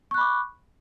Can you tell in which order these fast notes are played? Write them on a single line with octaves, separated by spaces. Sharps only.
C#6 F#6 B5 D6